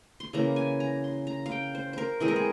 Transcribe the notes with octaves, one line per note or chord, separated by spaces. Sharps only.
C6
C#3 E3 A#3 A#5
G#5
A#5
C6
A#5
F5
G5
C5
A#4 C5
E3 G#3 C4 G#4
A#4
G#4